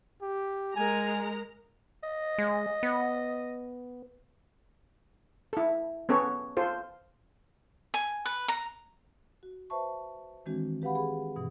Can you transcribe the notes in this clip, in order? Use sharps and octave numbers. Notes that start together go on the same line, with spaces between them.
G4
G#3 A#4 G#5 A#5
D#5
G#3
B3
E4 A4
B3 C#4 A4 C#5
F4 A4 C5
G#5
B4
A#5
F#4
B4 C5 E5 A5 C#6
D#3 E3 G#3 C4 D4 F#4
G4 B4 F5 F#5 B5
G#4 B5
G2 B2 E3